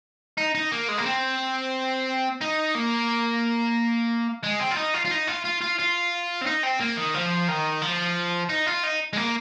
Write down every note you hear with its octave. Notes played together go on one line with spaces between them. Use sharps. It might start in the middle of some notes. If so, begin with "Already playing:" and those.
D#4
D#4
A#3
G#3
A#3
C4
D#4
A#3
G#3
C4
F4
D#4
F4
F4
D#4
F4
F4
F4
F4
C4
D#4
C4
A#3
D#3
F3
D#3
F3
D#4
F4
D#4
G#3
A#3